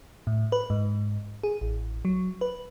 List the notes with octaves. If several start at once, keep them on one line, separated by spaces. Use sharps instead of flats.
A2
B4
G#2
G#4
A1
F#3
B4